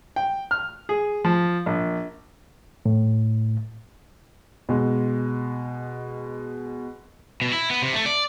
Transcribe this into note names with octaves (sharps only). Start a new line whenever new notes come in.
G5
F6
G#4
F3
A#1
A2
B2 G#3
B2
E4
B3
C3
A3
D5